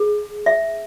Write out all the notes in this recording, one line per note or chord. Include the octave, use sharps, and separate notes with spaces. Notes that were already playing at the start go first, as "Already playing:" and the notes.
Already playing: G#4
E5